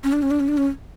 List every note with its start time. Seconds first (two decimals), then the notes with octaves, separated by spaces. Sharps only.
0.04 C#4
0.13 D4
0.22 C#4
0.31 D4
0.40 C#4
0.48 D4
0.57 C#4